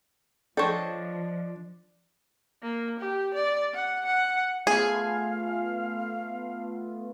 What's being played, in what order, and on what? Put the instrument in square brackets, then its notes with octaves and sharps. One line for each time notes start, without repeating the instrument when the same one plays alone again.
[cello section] F3 [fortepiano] D4 [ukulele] A4 C5 D#5 [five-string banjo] C#5 G5
[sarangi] A#3
G4
D5
F#5
F#5
[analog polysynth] A3 B3 F4 [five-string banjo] G#4 [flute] F5 [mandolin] G#5